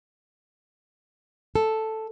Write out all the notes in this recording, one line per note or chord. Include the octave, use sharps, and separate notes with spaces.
A4